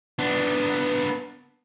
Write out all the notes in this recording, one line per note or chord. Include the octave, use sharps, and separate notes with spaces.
B3 D4